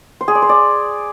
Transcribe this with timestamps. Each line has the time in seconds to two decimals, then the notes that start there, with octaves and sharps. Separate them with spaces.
0.21 C5
0.28 G#4
0.35 D5
0.42 C5
0.49 D5